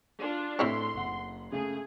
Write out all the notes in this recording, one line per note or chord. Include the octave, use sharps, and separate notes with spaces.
D4 F4
A2 C4 E4 A4 C#5 C6 B6
F#1 F#5
C#3 A3 G#4